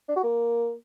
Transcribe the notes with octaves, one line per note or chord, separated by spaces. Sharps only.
D4
F#4
A#3